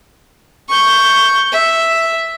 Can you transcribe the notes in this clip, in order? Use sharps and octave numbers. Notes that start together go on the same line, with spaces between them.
C#6 G6
E5